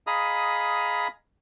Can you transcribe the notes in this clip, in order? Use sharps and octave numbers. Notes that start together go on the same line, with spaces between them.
G#4 D#5 F5 A#5 B5 D#6